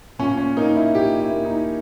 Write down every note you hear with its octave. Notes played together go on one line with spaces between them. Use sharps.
A#2 C#4
C#4
A#3 D#4
D#4
E4
A#2 G4
E4
A#3
D#4